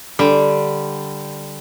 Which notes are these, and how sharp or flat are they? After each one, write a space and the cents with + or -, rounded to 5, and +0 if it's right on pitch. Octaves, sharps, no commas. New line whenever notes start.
D3 +0 G3 +0